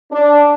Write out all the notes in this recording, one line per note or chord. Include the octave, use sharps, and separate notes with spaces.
D4